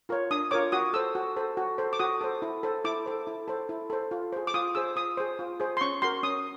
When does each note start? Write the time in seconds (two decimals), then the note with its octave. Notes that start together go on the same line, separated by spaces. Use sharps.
0.09 F4 A#4 C#5
0.31 D4 D#6
0.51 F4 A#4 C#5 D6
0.72 F#4 D#6
0.93 A4 C5 E6
1.15 F#4
1.36 A4 C5
1.57 F#4
1.78 A4 C5
1.93 D6
1.99 F#4 D#6
2.21 A4 C5
2.42 E4
2.63 A4 C5
2.84 E4 D6
3.06 A4 C5
3.27 E4
3.48 A4 C5
3.69 E4
3.90 A4 C5
4.11 F4
4.33 G#4 C5
4.47 D6
4.54 F4 D#6
4.75 G#4 C5 E6
4.96 F4 D#6
5.17 G#4 C5
5.39 F4
5.60 G#4 C5
5.77 C6
5.81 C#4 C#6
6.02 F#4 A#4 C6
6.23 C#4 D#6